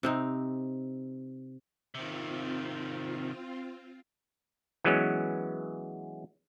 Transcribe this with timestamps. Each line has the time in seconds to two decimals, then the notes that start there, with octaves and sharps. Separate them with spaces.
0.03 C3 C4 D#4
1.95 C3 D#3 C4 F4
4.84 E3 F#3 G#3 B3 C#4